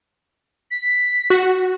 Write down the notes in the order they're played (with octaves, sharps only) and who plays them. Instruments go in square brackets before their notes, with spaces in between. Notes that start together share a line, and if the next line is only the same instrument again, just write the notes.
[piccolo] B6
[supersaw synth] F#4